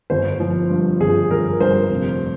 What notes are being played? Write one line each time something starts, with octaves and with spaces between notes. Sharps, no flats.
G1 C5
F3
G2
G1 G#4
G1 A#4
G2 C5
F1